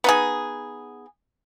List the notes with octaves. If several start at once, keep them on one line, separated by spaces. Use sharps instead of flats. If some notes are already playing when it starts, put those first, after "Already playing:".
B3 D#4 G#4